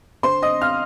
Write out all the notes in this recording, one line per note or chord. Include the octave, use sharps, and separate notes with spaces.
D3 C5 C6
D#5 D#6
F5 F6